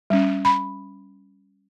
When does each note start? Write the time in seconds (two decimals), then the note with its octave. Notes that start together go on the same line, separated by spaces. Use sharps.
0.10 G3 C#4
0.45 B5